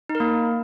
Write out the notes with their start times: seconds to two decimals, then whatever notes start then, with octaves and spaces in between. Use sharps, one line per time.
0.09 D#4
0.15 A#4
0.20 A#3